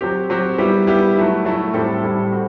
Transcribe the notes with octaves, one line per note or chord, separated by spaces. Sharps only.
F#3 C4 G4
F#3 C4 G4
G3 B3 E4 G4
G3 B3 E4 G4
F#3 A3 E4
F#3 A3 E4
A2 G3 C4 E4 A4
A2 G3 C4 E4 A4
C4 F#4